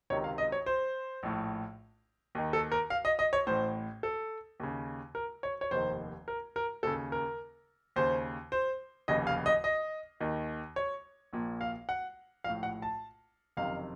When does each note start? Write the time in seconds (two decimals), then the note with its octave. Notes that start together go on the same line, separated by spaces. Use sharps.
0.10 C#2 C3 D#3 C#5
0.24 F5
0.38 D#5
0.52 C#5
0.66 C5
1.23 A#1 A2
2.35 D#2 D#3
2.53 A4
2.72 A#4
2.90 F5
3.05 D#5
3.19 D#5
3.33 C#5
3.47 A1 A2 C5
4.03 A4
4.60 D#2 C#3
5.15 A#4
5.43 C#5
5.61 C#5
5.71 F1 D#2 D#3 C5
6.28 A#4
6.56 A#4
6.83 D#2 C#3 A4
7.12 A#4
7.96 D#2 C#3 C5
8.52 C5
9.08 F1 D#2 C#3 D#5
9.27 F5
9.46 D#5
9.64 D#5
10.20 D#2 D#3
10.76 C#5
11.33 A#1 A#2
11.61 F5
11.89 F#5
12.44 A#1 A2 F5
12.63 F#5
12.82 A5
13.57 F#1 F2 C3 D#3 F5